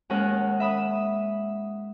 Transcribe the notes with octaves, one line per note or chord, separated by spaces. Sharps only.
D#2 G#3 C#4 A#4 F#5 F6
E5 B5 D#6